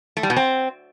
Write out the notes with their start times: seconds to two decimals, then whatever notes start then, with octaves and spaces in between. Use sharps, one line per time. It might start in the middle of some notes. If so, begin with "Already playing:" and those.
0.17 A3
0.23 G3
0.30 B2
0.37 C4